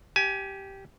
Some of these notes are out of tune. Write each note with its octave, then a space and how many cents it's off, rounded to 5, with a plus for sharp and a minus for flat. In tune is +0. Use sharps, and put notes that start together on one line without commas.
G4 -10 G#5 +20